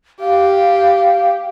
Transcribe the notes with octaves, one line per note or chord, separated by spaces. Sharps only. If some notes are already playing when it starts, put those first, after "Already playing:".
G4 F5